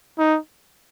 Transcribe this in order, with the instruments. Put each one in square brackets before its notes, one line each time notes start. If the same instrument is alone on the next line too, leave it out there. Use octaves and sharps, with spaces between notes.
[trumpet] D#4